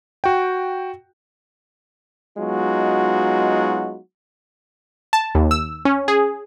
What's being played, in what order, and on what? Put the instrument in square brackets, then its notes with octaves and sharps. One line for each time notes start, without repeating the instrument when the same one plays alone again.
[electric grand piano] F#4 G5
[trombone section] F#3 G#3 B3 D#4 F4 F#4
[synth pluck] A5
D#2
E6
C#4
G#4